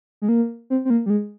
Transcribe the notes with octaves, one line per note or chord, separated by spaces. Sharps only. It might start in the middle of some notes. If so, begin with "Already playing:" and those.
G#3
A#3
C4
C4
A#3
G3
G#3